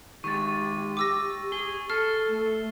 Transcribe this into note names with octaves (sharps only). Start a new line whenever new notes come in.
D#3 G#3 G4 C#6 A6
D6 E6 A#6
G#4 G7
A4 F6 C7
A3